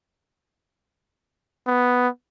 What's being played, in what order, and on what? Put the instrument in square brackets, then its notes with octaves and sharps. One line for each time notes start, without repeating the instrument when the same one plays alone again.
[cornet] B3